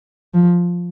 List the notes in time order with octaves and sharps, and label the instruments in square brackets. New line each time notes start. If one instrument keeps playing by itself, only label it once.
[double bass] F3